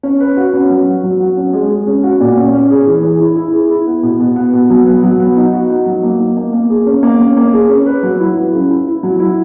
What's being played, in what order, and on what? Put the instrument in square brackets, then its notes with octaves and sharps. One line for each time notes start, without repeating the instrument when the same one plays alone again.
[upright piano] C#4
B4
F#4
C#4
F#3
F#4
F#3
F#4
C#4
G#3
G#3
C#4
F#4
A#2
C#4
C#4
G#4
E3
G#4
E4
E4
G#4
E4
B3
B2
B2
B3
B2
F#3
B3
F#3
B3
D#4
F#4
D#4
F#3
A#3
D#4
A#3
A#3
G#4
C#4
A#3
C#4
A#3
G#4
C#4
B4
F#3
E4
F#3
C#3
E4
E4
F#3
E4